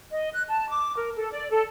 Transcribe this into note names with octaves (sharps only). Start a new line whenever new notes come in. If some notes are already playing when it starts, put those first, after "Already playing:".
D#5
F#6
A5
D6
A#4
A4
D5
A4